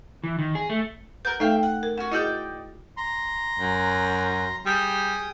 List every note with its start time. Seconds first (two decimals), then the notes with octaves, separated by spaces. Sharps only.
0.24 E3
0.39 D#3
0.55 G#4
0.69 A3
1.25 A#4 B4 F#5 G6
1.40 A3 D#4 A4 E5 F5 G5
1.63 F#5
1.83 A#4
1.98 C#4 F#4 F#5
2.12 D#4 E4 F#4 G#4 D5 G5
2.97 A#5 C6
3.59 F#2
4.66 G3 G#4 G5 D#6